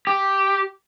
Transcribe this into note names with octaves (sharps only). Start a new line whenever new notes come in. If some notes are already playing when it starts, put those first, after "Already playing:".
G4